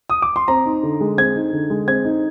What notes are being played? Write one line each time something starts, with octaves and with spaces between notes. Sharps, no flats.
D#6
D6
C6
C4 A#5
D#4
D3
G#3
C4 G#6
D#4
D3
G#3
C4 G#6
D#4